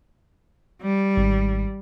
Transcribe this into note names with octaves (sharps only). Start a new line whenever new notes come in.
G3
G#1